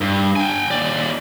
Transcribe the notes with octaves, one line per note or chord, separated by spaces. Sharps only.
G2
G5 G#5
D#2 D5